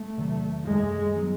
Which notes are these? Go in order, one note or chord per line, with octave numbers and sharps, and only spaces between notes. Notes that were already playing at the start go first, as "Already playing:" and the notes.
Already playing: A3
E2 C3 D#3 F#3
F#2 D#3 G3 G#3
D#3 F#3 B3 D#4